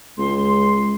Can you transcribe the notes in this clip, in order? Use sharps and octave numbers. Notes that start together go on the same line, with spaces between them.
C#2 G#3 C6